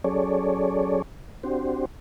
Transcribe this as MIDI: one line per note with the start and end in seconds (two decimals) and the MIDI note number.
0.04 1.02 54
0.04 1.02 61
0.04 1.02 68
0.04 1.02 69
0.04 1.02 73
0.04 1.02 74
1.43 1.85 60
1.43 1.85 62
1.43 1.85 66
1.43 1.85 67
1.43 1.85 72